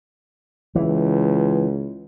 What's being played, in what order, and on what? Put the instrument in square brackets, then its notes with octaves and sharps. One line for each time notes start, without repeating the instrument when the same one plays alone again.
[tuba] C#2 [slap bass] E3